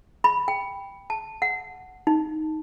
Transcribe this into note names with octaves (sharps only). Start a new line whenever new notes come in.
B5
G5
A5
F#5
D#4